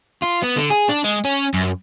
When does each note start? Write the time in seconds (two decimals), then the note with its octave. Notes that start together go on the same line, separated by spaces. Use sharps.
0.23 F4
0.44 B3
0.57 D3
0.71 G#4
0.89 D4
1.04 G#3
1.25 C#4
1.54 F#2